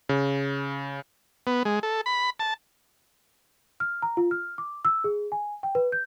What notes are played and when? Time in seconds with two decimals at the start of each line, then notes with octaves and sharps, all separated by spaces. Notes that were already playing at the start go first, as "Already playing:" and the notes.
0.09 C#3
1.47 B3
1.65 G#3
1.83 A4
2.06 B5
2.39 A5
3.80 F6
4.02 A#5
4.17 F4
4.31 F6
4.58 D6
4.85 E6
5.04 G#4
5.32 G#5
5.63 G5
5.75 B4
5.92 G6